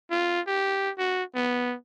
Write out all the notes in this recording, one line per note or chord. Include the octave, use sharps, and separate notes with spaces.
F4
G4
F#4
B3